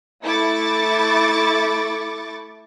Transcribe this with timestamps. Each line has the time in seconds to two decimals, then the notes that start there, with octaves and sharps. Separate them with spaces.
0.23 A3 E4 C#6 D6 A6